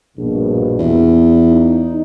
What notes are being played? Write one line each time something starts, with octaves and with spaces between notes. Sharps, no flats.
A#1 G2 B2
E2
D#4